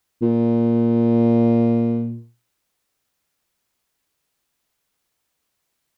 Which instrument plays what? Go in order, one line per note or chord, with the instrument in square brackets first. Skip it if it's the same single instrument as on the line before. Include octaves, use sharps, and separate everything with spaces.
[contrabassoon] A#2